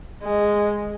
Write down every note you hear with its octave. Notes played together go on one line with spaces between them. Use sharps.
G#3